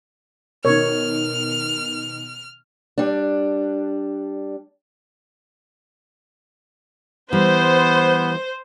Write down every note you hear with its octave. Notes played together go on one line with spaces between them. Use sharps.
B2 D#3 A#4 C#5 F6
G3 D4
E3 G3 B3 C5